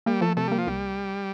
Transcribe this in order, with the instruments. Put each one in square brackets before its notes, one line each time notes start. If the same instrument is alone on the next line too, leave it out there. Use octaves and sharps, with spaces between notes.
[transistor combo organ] G3 [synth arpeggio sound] A#3
[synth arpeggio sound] F3 [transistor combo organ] A3
[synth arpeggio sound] C3 [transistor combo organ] A3
[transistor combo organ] G3 [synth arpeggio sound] A#3
[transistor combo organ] F3
[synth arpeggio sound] C2 [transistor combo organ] G3